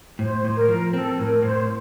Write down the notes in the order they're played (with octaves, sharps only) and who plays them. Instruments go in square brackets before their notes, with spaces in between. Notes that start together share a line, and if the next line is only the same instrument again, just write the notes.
[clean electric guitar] A2 [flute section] C5
[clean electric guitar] A2
[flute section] A#4
[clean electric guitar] F3
[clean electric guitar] C4 [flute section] A4
[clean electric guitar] A2 [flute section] A#4
[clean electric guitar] A2 [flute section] C5